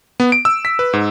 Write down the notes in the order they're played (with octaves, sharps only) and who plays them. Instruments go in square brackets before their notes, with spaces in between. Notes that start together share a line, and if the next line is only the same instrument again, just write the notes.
[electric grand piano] B3
D7
E6
B6
B4
G#2